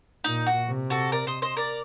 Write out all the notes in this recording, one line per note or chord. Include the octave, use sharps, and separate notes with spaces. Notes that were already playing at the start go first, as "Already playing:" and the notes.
A#2 D#4
F#4
C3
F#4 A4
A#4 D5
C5 D#5
C5 D#5
A#4 D5